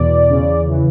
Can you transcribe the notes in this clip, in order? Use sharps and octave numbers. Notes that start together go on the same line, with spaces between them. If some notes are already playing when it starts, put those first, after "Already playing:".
Already playing: E2 B2 D5
C#3
E3